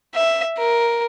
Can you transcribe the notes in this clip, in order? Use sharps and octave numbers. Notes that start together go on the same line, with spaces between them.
E5
A#4